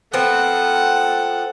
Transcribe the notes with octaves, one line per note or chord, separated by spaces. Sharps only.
F3 B3 C4 A4 F#5